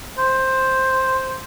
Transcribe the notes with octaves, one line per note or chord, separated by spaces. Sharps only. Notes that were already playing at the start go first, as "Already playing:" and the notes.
C5